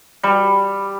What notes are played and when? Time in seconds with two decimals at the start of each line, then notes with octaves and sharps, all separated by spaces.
0.23 G3